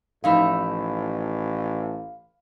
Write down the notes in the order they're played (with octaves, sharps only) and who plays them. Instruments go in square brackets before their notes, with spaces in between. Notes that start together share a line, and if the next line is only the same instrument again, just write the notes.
[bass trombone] A1 [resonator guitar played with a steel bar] F3 D#4 E5 [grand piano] F5 B5